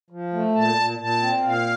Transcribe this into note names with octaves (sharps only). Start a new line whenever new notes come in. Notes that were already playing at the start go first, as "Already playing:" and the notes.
F3
A3
A#2 A5
A#2
A#2 A5
C4
A#2 F5